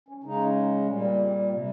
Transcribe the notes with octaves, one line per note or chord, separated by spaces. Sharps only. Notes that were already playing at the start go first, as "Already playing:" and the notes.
C#4
C#3 G#3 D#4
A#2 G3 C#4
C4
C4
C3 G3 A#3